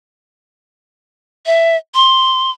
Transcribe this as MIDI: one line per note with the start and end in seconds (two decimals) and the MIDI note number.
1.46 1.77 76
1.95 2.51 84